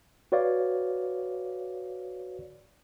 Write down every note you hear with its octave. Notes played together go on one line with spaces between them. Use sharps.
F#4 B4 C#5 D5 F5